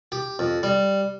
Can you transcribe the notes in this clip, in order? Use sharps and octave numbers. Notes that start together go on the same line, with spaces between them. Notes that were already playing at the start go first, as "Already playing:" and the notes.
G4
F2
G3